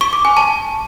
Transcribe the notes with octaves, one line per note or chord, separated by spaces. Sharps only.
C#6
D6
G#5
A5